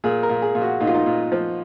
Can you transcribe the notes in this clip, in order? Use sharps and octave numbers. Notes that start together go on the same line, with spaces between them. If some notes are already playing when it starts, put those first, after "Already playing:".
A#2 G#4
A#4
A#2
G#4
A#2
F#4
A#2 D#4
F4
D#4
A#2
F3